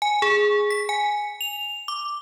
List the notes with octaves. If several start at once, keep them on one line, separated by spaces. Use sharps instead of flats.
G#5
G#4
B6
G#5
F7
D6